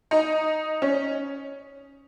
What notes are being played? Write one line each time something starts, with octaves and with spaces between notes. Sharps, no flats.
D#4
C#4